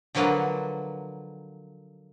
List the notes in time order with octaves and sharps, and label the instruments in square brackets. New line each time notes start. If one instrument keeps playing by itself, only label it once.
[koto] D3 F3 F#3 A#3 B4